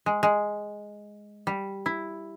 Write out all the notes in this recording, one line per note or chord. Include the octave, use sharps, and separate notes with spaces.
G#3
G#3
G3
E4